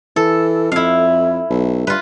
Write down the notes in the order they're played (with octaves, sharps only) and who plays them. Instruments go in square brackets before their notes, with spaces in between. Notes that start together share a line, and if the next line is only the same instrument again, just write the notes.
[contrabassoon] E3 [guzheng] A4
[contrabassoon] F2 [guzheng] E4 F5
[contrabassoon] B1
[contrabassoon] G2 [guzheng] F4 B4